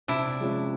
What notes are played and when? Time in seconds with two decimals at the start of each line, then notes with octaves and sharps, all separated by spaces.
0.08 C3 D4 E4
0.40 F3 G#3 C#4